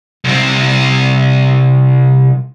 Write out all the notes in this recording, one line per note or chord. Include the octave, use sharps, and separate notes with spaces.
C2 C4